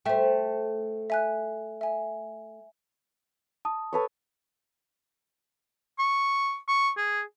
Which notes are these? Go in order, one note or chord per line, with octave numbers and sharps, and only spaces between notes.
A3 C5 E5 G5
E5 G#5 F#6
E5 G#5
A5 D#6
A4 B4 C#5
C#6
C#6
G#4